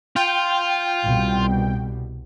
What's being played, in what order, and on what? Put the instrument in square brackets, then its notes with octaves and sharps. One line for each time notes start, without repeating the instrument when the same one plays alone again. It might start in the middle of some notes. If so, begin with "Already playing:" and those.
[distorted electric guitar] F4 [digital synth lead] G5
[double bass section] C2 B2 G3